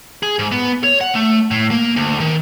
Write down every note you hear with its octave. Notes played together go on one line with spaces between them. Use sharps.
G#4
G#2
B3
C#5
F#5
A3
A2
A#3
D2
D#3